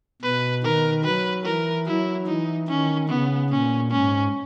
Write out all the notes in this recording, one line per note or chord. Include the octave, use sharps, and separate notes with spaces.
B2 B4
D#3 A#4
F#3 B4
E3 A#4
F#3 E4
E3 D#4
D#3 C#4
C#3 B3
A#2 C#4
G#2 C#4